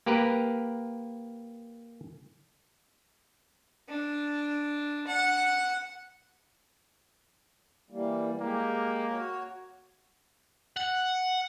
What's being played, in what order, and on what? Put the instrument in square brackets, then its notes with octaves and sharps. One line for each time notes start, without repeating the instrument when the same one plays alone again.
[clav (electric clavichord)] A#3 G4 A#4 B4
[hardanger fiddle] D4
F#5
[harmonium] E3 G3 A#3
[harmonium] G#3 G4 [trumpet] A#3
[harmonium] F#4 C#5
[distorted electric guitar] F#5